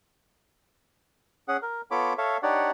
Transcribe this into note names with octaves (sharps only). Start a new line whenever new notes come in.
C#4 G#4 F#5
A#4
B3 F4 A4 C#5 B5 D6
A4 C#5 E5 F5
D4 D#4 G4 C#5 D5 F#5